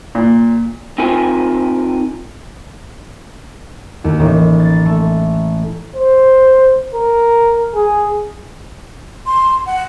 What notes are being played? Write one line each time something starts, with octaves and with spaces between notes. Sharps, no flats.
A#2
C4 D#4 F4 A#4 G#5
D#2
A1
A6
A3
C5
A#4
G#4
C6
F#5